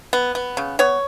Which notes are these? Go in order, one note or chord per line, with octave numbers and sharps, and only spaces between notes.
B3
B3
C#3
B3 C#5